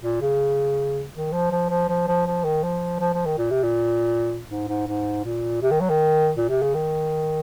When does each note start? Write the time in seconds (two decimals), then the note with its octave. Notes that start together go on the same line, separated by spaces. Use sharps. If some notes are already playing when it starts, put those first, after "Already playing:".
0.02 A#2
0.21 C#3
1.15 D#3
1.32 F3
1.51 F3
1.70 F3
1.88 F3
2.08 F3
2.26 F3
2.44 D#3
2.63 F3
3.00 F3
3.14 F3
3.26 D#3
3.38 A#2
3.51 C3
3.63 A#2
4.50 G#2
4.68 G#2
4.87 G#2
5.25 A#2
5.62 C3
5.71 D#3
5.81 F#3
5.90 D#3
6.37 A#2
6.49 C3
6.62 C#3
6.74 D#3